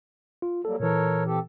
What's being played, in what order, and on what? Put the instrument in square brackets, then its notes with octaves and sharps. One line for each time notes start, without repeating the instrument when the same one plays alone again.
[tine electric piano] F4
[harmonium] F#3 G3 A#3 [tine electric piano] A4
[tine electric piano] A#2 E3 [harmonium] A4 A#4 C#5
[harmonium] C4 G4 A4